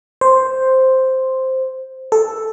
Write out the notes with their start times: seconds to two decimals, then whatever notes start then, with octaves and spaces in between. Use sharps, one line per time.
0.21 C5
2.12 A4